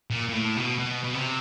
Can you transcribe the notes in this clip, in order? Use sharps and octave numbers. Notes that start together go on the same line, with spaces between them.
A#2
A#2
A2
B2
B2
B2
C3